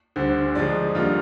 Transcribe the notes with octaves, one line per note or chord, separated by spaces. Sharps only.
D2 D3 G3 C5
G#2 F3 G#3 D5
D#2 D3 G3 F4